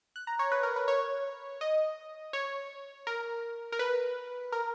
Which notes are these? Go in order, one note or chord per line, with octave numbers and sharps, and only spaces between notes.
F#6
A#5
C#5
B4
A#4
B4
C#5
D#5
C#5
A#4
A#4
B4
A#4